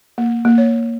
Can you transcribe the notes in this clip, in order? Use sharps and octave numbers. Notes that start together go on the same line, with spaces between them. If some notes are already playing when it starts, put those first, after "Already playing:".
A#3
A#3
C#5